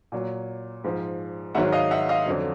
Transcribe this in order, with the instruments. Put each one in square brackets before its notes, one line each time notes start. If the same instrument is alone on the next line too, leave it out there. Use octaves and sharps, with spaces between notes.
[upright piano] A#2 F#3
G#2 F3
G#2 D#3 F#3 E5 F#5
D#5 F5
E5 F#5
D#5 F5
F2 D3 F#3